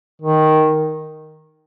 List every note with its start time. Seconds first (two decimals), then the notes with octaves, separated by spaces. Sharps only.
0.21 D#3